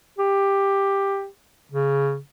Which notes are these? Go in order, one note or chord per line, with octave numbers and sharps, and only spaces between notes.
G4
C#3